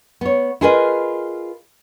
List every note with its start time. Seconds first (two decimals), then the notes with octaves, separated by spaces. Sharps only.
0.21 B3 C#5
0.61 E4 F4 G#4 A#4 B4 D#5